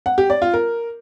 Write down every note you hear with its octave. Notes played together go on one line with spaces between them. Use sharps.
F#5
G4
D5
F4
A#4